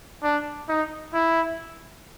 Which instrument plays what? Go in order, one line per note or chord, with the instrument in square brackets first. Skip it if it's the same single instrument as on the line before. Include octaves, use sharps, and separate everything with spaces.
[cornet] D4
D#4
E4